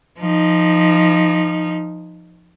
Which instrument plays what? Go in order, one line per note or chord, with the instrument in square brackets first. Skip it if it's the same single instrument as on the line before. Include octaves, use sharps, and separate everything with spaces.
[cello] F3 D#4